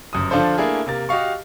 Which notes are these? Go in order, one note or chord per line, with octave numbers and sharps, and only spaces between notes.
G1 F#2 D#6
D3 F3 D4 F4 A4 C5
A3 A#3 D4 E4 G#4
C3 A#3 A6
F#4 G4 D#5 F5 C#6